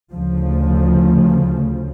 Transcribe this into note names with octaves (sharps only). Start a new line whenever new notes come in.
D2 C#3 F3